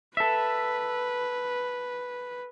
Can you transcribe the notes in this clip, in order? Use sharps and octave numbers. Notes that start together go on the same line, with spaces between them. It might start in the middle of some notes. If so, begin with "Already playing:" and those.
A4 B4 E5